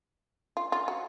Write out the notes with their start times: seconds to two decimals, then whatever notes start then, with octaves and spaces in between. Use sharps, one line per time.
0.57 F4
0.72 F4
0.88 F#4